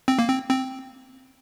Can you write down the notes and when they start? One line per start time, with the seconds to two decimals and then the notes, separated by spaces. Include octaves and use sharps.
0.08 C4
0.19 A#3
0.28 C4
0.50 C4